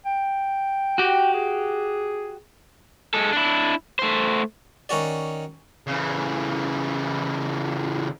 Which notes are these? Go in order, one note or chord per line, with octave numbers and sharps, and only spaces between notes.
G5
F#4 G4
G#4
G#3 A4
D4 E4
A3 C5
D#3 C#4 F#4 D5
C#3 E3